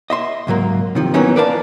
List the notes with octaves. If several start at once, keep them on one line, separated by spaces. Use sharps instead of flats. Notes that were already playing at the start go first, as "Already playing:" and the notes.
D#5 E5 C6
C#2 G#2 F#3 A#3
C3 D#3 F3
E3 F#3 A#3 B3 C#4 D#4
A#4 B4 D5 F5 G5 A5